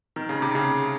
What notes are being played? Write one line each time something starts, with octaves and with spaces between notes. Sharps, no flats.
D#3
C#3
C3
C#3